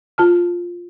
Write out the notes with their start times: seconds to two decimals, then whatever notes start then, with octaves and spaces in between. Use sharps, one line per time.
0.18 F4 A5 F6